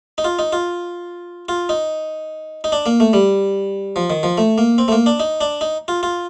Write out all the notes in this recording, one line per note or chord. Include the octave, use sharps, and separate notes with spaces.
D#4
F4
D#4
F4
F4
D#4
D#4
D4
A#3
A3
G3
F3
D#3
F3
A3
A#3
C4
A3
A#3
D4
D#4
D4
D#4
F4
F4